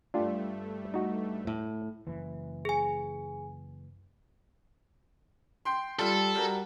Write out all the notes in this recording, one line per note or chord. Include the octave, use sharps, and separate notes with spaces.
G2 A3 D4 F4 G4
D#4 F#4 A#5
A2 E5
F#1 E3
G#4 G#5
G5 C6
G3 F4 A4
G3 F#4 A#4